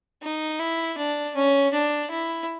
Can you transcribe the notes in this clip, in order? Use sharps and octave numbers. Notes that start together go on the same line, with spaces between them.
D#4
E4
D4
C#4
D4
E4